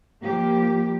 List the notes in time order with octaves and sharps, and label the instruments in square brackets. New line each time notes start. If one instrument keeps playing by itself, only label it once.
[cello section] F3 G3 A#3 G4